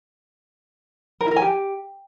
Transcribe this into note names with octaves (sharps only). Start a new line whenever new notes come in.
A#4
E4
A#4
G#5
G4